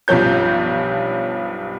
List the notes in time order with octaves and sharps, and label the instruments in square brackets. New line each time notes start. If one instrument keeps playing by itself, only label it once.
[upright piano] B1 G2 F3 C#4 C#5 G6